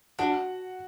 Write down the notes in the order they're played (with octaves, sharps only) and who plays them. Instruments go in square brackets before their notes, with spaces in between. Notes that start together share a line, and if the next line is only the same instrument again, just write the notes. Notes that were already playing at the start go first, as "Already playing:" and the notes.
[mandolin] D4 [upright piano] F#4 F#5